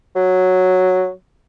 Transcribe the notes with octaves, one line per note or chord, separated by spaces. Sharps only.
F#3